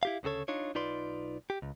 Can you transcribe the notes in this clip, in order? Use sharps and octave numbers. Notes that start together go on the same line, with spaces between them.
E4 G4 F5
D2 C#3 F#4 A4 C#5
D4 D#4 F4 C#5
B1 D#4 F4 B4 D5 C6
G4
C#2